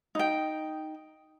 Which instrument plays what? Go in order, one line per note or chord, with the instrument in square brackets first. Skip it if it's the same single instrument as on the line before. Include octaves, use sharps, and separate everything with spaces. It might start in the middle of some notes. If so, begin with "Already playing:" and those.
[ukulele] D#4 G5